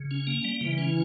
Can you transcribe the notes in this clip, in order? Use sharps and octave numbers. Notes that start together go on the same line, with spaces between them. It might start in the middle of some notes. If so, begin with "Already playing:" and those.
Already playing: C#3
C#4
A#3
G3
C#3 E3
C#4